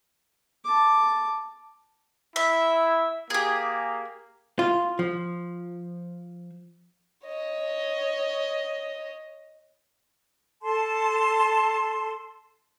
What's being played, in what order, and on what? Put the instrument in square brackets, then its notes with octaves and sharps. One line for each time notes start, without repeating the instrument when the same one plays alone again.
[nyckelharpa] A5 D6
[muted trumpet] E4 [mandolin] E5
[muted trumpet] A#3 [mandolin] G4 G#4
[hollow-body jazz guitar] F4
F3
[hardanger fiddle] C#5 D#5
[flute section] A4 A5 C6